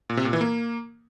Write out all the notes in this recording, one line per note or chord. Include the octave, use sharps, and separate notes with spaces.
A#2
C3
A#2
E3
A#3